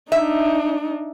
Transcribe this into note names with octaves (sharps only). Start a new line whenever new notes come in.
D4 D#4 E5